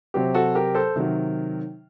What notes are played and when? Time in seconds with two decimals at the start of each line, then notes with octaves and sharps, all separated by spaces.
0.14 C3 F#3 C4 G4
0.34 F#4 A4
0.55 G4 A#4
0.75 A4 C5
0.96 C3 D#3 F#3